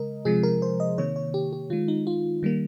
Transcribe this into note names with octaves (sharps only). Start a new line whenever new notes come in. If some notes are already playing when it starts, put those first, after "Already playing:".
Already playing: C#3 G#3 A#4 D#5
C3 F3 G#3 G#4
A#4
C5
D#5
C3 D#3 A#3 C#5
C#5
G4
G4
D#3 G#3 F4
D#4
F4
D#3 G3 A#3